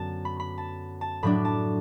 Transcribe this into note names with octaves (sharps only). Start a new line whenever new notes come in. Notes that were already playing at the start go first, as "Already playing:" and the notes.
Already playing: F#2 D3 F#3 B3 A5
B5
B5
A5
A5
A2 F#3 D4 B5
A5